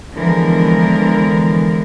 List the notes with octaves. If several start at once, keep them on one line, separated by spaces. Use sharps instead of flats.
D3 E3 F3 G#3 B3 A#4